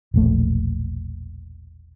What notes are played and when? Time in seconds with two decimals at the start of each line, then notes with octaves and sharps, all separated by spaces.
0.14 E1 A#1 A3